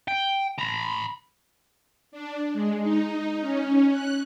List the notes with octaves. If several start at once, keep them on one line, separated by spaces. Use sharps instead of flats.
G5
A#5 B5
D4
G#3
D#4
C#4
F#6